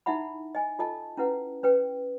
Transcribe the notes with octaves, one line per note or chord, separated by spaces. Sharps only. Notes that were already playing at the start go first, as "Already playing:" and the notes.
D#4 E4 E5 F#5 B5
D#5 G#5
F4 A4 D#5 A5
C#4 E4 B4 F#5
C#4 B4 G5